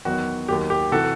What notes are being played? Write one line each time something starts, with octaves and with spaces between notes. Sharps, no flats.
E2 D#3 F#3 F#4
D#2 D#3 F#3 G4
G4
C3 E3 F#4 A4